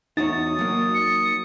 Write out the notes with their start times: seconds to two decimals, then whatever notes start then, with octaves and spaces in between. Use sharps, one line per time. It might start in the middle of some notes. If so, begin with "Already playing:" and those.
0.17 E2 D#4 F#4 C#5 D#6 A6
0.59 F#3 A#3
0.94 C#7